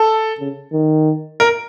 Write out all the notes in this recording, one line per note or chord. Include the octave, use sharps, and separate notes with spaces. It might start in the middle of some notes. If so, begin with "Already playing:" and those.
Already playing: A4
C#3
D#3
A#4